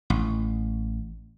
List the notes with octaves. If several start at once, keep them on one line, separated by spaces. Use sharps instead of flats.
A1